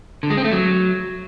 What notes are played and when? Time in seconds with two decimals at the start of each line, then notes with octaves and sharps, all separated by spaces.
0.23 D3
0.30 G#3
0.37 C4
0.44 A3
0.52 F#3